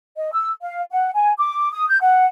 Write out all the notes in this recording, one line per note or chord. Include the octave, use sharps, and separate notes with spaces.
D#5
E6
F5
F#5
G#5
D6
D#6
G6
F#5